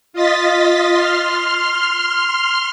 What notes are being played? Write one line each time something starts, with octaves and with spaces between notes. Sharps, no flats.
F4 D#5 A6 B6
C6 F6